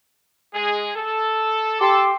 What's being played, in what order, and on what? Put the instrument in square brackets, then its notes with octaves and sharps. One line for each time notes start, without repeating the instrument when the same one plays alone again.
[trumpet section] G#3 G#4
A4
[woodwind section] G4 C6 D6 [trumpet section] A4